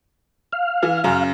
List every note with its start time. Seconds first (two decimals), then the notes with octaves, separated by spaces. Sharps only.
0.53 F5
0.83 E3
1.04 F#2 C#3